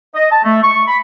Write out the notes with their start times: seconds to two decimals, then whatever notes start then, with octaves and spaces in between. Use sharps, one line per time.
0.14 D#5
0.31 A5
0.44 A3
0.63 C#6
0.87 B5